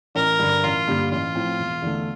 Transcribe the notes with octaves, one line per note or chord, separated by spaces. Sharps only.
A1 A#4
G2 D3
A1 F4
G2 D3 G3 A#3
A1 F4
A2 F3 C4
E1
E2 D3 A3